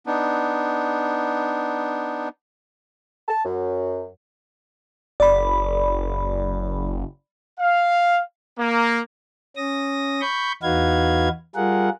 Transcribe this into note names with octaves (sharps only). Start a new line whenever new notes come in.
B3 D4 D#4
A5
F#2
F#1 D5 B5
F5
A#3
C#4 D#6 A#6
B5 C#6 G6
E2 D#4 F#4 B4 F5 G#6
G3 F4 G#4 A#4 F#5